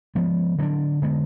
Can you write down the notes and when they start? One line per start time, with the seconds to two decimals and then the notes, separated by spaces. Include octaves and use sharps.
0.15 F3 G#3 B3
0.58 D3 F#3 B3 D4
1.02 D3 G#3 B3